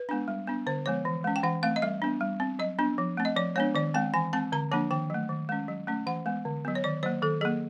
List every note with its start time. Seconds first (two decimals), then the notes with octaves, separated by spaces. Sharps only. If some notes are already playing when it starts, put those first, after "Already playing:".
Already playing: B4
0.09 G#3 B3 D4
0.28 G3
0.47 B3 D4
0.66 D3 C5
0.86 F3 G#3 B3 C#5
1.05 E3
1.24 G#3 C#4
1.36 G5
1.43 E3 F#5
1.63 A3 C4 F5
1.76 D#5
1.82 G3 E5
2.02 B3 D4
2.21 G3
2.40 C4
2.59 F#3 D#5
2.79 B3 D4
2.98 F3
3.17 A3 C4
3.25 D#5
3.36 F3 D5
3.56 G#3 B3 D4 C#5
3.75 D#3 D5
3.94 G#3 C4 G5
4.14 E3 G#5
4.33 G#3 C4 A5
4.52 D3 A#5
4.71 F3 A#3 D4 A5
4.91 D#3 G5
5.10 F#3 A3
5.29 D#3
5.49 G#3 C#4
5.68 F#3
5.87 A3 C#4
6.06 E3 F#5
6.26 G#3 B3
6.45 D3
6.65 F#3 B3
6.75 C#5
6.84 D#3 D5
7.03 F#3 A#3 C5
7.22 D#3 A4
7.41 F#3 A#3 G#4